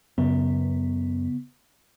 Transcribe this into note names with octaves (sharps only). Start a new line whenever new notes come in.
F#2 C#3 B3